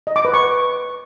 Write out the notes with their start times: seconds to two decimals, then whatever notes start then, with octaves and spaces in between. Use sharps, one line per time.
0.07 D#5
0.16 D6
0.25 B4
0.34 C#6